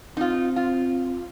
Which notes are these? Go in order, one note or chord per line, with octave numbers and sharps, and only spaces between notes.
C4 D#4 F4
F4